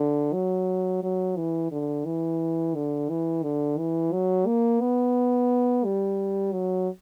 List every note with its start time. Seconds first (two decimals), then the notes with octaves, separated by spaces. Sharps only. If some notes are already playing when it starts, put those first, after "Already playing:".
Already playing: D3
0.33 F#3
1.03 F#3
1.37 E3
1.72 D3
2.05 E3
2.75 D3
3.09 E3
3.43 D3
3.78 E3
4.13 F#3
4.46 A#3
4.81 B3
5.85 G3
6.53 F#3